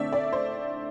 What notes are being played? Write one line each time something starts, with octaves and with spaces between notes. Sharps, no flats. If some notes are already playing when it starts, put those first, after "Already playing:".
Already playing: D3 A3 C4 A4 D5 E5
D5
C5